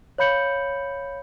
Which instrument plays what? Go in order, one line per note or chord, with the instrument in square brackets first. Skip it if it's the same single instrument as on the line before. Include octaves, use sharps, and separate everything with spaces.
[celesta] C#5 F5 B5 G6 C#7 F#7